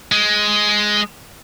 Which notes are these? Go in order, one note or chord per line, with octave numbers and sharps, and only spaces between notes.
G#3